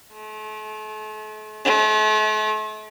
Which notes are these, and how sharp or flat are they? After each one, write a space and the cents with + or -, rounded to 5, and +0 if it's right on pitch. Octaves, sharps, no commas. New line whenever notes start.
A3 -40
A3 -45